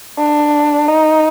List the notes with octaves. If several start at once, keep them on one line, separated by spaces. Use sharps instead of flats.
D4
D#4